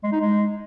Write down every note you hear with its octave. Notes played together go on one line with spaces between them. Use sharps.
G#3
D#4
G#3